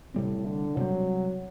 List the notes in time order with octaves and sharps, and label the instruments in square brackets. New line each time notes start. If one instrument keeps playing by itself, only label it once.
[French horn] A2 [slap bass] C3 G3 C4
[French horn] D3
[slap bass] C3 G3 C4 [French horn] F#3